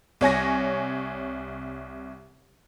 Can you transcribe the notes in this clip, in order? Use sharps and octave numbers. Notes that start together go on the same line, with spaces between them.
C2 C#5 G#5 A#6